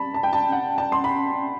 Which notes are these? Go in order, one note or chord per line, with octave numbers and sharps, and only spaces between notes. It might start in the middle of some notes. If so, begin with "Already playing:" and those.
Already playing: A5 B5
A5
G5
A5
F#5
A5
C6
B5